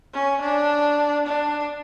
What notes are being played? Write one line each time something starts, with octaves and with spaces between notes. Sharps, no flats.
C#4
D4
D4